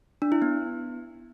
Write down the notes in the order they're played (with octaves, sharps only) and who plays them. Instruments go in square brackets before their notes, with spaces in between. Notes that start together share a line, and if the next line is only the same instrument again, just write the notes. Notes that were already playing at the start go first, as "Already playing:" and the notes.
[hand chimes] D4
E4
B3